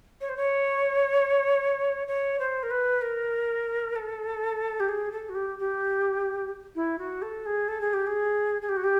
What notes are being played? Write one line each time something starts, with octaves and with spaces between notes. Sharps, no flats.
C#5
C5
C#5
C#5
C5
A#4
B4
A#4
A4
G4
G#4
A4
F#4
G4
G4
E4
F#4
A4
G#4
A4
G#4
G4
G#4
G#4
G4
F#4
G4